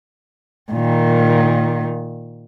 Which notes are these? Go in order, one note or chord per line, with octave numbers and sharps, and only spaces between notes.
A#2 D#3